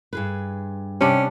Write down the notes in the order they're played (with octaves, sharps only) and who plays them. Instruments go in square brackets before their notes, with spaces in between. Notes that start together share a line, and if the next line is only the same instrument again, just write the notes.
[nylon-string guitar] G2 G#4 B4
[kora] C3 G3 D4 [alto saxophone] C#4